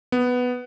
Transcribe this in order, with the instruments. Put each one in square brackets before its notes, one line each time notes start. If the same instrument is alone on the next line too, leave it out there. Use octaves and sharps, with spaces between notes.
[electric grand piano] B3